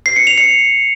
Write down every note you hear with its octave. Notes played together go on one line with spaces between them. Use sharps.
C7
C#7
F7
C#7